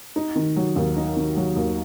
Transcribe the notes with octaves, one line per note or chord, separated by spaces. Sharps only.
D#4
D#3
F#3
D#2
D#4
D#3
F#3
D#2